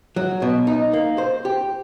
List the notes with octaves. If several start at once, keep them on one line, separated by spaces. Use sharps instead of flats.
F#3
B2
D#4
A#3
C5
G4